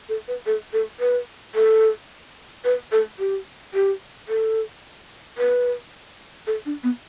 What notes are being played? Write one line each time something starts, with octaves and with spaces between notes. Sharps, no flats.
A4
B4
A4
A4
B4
A4
B4
A4
G4
G4
A4
B4
A4
D4
B3